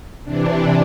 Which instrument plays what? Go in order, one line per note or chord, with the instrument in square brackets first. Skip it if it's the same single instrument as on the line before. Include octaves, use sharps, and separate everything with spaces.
[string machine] C3 E3 D4